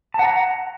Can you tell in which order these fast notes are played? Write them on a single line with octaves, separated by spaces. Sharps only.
A5 F#5 A#5